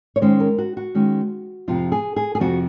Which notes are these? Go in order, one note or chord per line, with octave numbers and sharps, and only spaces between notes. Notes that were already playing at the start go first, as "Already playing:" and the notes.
C#5
D#3 G#3 C#4 C5
A#4
F#4
F#4
D#3 G#3 C#4
F2 C3 F3 F4
G#4
G#4
G#4
F2 C3 F3 F#4